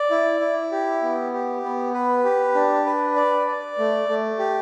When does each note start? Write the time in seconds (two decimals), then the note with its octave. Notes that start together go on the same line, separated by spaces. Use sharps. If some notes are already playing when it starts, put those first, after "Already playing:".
Already playing: D5
0.11 E4
0.40 E4
0.72 G4
1.02 B3
1.33 G4
1.64 B3
1.94 B4
2.24 G4
2.55 D4
2.86 B4
3.16 D5
3.47 D5
3.78 A3
4.09 A3
4.39 G4